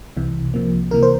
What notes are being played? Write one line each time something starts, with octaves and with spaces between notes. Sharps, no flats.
C2 C3 E3
C2 C3 F3 A#3
C#2 C3 E3 A#3 A#4
C5